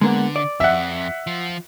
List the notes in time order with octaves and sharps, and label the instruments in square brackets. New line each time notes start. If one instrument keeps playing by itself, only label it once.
[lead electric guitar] D3 [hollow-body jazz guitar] G#3 A#3 B3
[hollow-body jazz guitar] D5
[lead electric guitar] F2 [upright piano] E5 F#5
[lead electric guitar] F3